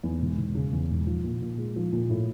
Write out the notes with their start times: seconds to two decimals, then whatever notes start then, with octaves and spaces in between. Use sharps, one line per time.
0.03 E2
0.22 E1
0.38 E1
0.55 C#3
0.73 E2
0.90 E1
1.07 F3
1.24 A#2
1.42 A#2
1.58 G#3
1.76 F3
1.93 A#2
2.09 A2